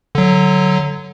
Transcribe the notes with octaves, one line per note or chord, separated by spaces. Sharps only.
D3 F#3